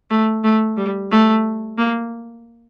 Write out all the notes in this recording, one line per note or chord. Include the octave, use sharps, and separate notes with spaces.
A3
A3
G3
A3
A#3